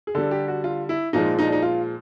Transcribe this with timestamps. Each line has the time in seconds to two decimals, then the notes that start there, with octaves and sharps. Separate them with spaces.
0.07 G#4
0.15 D3 G3 A4
0.31 G4
0.48 F#4
0.64 F4
0.89 E4
1.13 A#2 F3 G#3 D#4
1.39 D#4
1.45 D4
1.52 D#4
1.62 F4